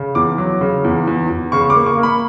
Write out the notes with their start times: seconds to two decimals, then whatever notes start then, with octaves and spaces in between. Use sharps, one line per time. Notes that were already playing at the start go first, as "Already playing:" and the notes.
Already playing: C#3
0.15 E2 D6
0.38 F#3
0.61 C#3
0.84 E2
1.07 E2
1.30 E2
1.52 C#3 C#6
1.70 D6
1.76 A#3
1.86 C#6
1.98 A#3
2.03 B5